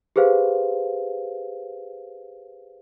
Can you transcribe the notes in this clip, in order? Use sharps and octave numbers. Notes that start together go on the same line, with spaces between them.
G4 G#4 B4 C5 F5